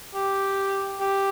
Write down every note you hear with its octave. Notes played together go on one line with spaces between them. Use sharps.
G4
G4